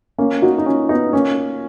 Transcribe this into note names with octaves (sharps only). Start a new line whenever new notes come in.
A#3 C#4
D#4 F#4
D#4
C#4 F4
B3 D#4
A#3 C#4